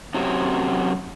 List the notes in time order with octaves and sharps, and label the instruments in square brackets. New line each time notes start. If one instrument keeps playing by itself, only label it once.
[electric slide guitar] F#2 C3 F#3